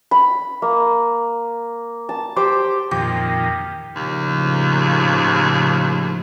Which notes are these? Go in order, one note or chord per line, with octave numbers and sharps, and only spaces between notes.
B5
A#3
A5
G4 C5 G5 D6
F2 A#2 D#3 G4
D#2 A2 C#3 F3